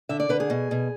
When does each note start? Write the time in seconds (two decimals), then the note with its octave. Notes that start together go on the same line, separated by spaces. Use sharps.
0.09 D3 E5
0.20 D5
0.29 D3 B4
0.40 G#4
0.50 B2
0.71 B2